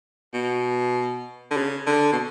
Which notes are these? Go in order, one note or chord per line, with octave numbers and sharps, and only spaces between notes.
B2
D3
C#3
D3
B2